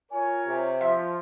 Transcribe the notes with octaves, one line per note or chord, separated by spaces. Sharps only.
F4 A#4 C#5 G#5
C3
F3 E5 C6